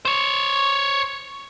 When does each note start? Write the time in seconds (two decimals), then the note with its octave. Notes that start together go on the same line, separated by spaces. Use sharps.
0.05 C5 C#5